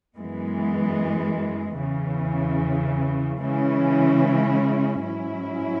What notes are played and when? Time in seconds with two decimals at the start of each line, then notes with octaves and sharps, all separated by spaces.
0.15 F#2 E3 G#3 B3
1.78 E2 C#3 E3
3.40 C#3 E3 G#3 C#4 E4
5.03 G#2 F#3 C#4 E4